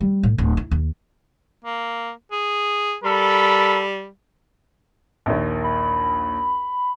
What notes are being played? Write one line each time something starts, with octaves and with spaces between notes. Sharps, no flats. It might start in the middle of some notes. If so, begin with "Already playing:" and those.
G3
A2
D1
E4
D#2
A#3
G#4
G3 A4 A#4 B5
A#1 D#2
B5